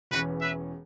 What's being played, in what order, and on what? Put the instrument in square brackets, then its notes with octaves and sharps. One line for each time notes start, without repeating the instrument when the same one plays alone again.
[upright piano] E1 E2 E3 C#4 [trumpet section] F#4 B4
[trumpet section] B4 E5